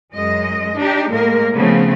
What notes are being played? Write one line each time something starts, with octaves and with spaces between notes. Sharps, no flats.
F#2 G#3 D#5
D4 D#4 G4
A2 G#3 A#3 A#4
C#3 F3 A3 B3 C4